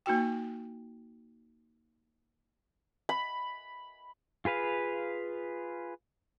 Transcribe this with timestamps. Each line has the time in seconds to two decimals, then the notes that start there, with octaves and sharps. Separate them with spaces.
0.06 A#3 D#4 F#4 G5
3.09 B5
4.45 F4 G#4 B4 F5